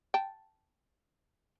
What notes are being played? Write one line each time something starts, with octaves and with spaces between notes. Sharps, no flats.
G5 A5